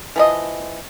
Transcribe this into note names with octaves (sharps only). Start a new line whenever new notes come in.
E3 F3 D#5